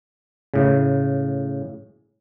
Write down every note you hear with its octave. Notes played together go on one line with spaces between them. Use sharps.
A2 C#3